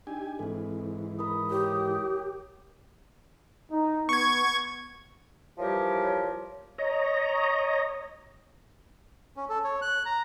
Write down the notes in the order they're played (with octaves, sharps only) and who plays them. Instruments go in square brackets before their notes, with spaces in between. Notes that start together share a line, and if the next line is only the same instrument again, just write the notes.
[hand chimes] D4 D#4 [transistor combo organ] G4 G#5
[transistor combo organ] G#2 E3 [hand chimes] C4 A4
[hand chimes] E4 A#4 B5 [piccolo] D#6
[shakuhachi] G4 [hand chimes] A#4 C#5
[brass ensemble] D#4
[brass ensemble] B3 [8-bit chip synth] C#6 G#6
[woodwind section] E3 F3 G3 G4 A#4 C#5
[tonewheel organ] C#5 D#5 A#5
[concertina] C#4
A4
C#5
F#6
A#5